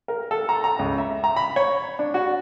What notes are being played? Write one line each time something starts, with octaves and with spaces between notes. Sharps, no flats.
A#4
A4
A#5
A#5
C#2
E5
A#5
B5
C#5
D4
F#4